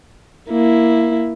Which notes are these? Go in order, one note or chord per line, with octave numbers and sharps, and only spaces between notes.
A#3 E4